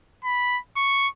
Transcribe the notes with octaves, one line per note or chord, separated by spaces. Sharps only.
B5
C#6